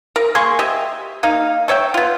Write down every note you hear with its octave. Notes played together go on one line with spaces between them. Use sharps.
A#4
A#3 G#4 C6 C#6
G4 D#5 E5
A#3 D#4 F5
A3 C#5 E5 G5
B3 F4